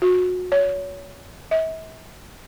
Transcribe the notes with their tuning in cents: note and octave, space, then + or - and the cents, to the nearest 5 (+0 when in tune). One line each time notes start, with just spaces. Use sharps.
F#4 -30
C#5 +25
E5 -40